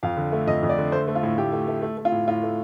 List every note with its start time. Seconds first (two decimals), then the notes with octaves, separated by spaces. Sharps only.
0.03 F2 F5
0.17 D3
0.32 A3
0.47 F2 D#5
0.63 F2
0.69 D5
0.78 D3
0.92 A3 C5
1.08 A3
1.15 F4
1.23 A2
1.38 A2 G4
1.53 A3
1.68 A3
1.82 A3
1.97 A3
2.05 F4
2.12 A2
2.28 A2 F4
2.43 A3